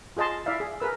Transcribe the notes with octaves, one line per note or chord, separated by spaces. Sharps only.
F4 G#4 D#5 A5 C6
E4 D5 E5 F5
G#4
G#4 A#4 B4 E6